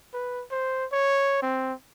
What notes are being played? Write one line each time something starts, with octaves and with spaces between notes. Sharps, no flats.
B4
C5
C#5
C4